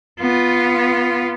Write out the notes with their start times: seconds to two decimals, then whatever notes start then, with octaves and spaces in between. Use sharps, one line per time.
0.20 B3 F4